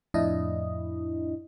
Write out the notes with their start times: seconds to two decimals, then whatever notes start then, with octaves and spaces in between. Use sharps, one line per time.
0.14 F2 A2 D4 E4 D#5